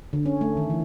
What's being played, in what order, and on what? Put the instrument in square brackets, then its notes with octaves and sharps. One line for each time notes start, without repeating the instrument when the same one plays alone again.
[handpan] D3
C#4
A3
D#3
E3